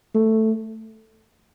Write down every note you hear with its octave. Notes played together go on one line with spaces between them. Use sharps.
A3